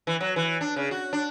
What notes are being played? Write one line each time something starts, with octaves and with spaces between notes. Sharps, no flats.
E3
F#3
E3
D4
C#3
F#4
D4